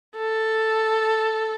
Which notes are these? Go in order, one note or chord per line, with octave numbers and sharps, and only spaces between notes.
A4